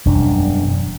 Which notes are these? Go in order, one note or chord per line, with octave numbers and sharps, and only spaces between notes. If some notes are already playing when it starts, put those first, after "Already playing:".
E1 F#2 G3 D4